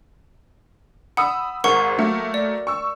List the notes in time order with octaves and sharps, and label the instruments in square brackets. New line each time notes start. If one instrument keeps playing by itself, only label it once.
[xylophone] F#5 [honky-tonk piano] B5 D#6 E6
[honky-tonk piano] G#1 G#2 [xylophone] A#4 F#5 C#6
[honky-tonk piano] F#3 A3 A#3
[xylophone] D5
[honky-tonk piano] C#6 E6